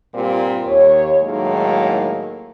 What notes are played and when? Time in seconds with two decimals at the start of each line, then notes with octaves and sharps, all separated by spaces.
0.13 G2 A#2 G3 A#3 C4 F4
0.66 D#2 C#5
1.23 A2 D#3 F#3 G#3 A#3 D#4